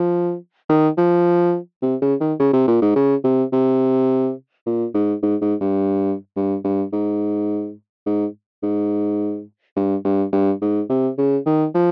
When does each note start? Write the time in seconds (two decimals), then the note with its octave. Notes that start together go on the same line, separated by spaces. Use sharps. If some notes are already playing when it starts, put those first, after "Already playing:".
Already playing: F3
0.69 D#3
0.97 F3
1.82 C3
2.02 C#3
2.20 D#3
2.39 C#3
2.53 C3
2.68 A#2
2.82 G#2
2.96 C#3
3.24 C3
3.53 C3
4.66 A#2
4.94 G#2
5.23 G#2
5.41 G#2
5.61 G2
6.36 G2
6.64 G2
6.93 G#2
8.06 G#2
8.63 G#2
9.76 G2
10.05 G2
10.32 G2
10.62 G#2
10.90 C3
11.18 C#3
11.46 D#3
11.75 F3